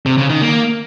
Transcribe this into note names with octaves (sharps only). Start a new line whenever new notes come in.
C3
C#3
D#3
A#3